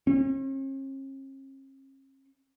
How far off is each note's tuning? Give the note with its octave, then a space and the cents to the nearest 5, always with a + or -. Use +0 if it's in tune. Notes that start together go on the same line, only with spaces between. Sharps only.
C#4 -45